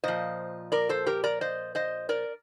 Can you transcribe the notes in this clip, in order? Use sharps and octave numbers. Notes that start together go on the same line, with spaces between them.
A#2 F3 C5 D#5
A#4 D5
A4 C5
G4 A#4
A#4 D5
C5 D#5
C5 D#5
A#4 D5